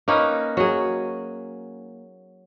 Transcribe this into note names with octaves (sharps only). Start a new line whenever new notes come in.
A#3 C#4 D#4 B4
F#3 G#4